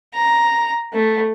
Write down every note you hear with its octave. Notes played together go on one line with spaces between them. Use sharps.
A#5
A3